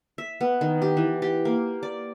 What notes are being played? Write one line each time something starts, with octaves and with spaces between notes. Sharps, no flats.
E5
B3
D#3
G4
E3
G4
A#3
D5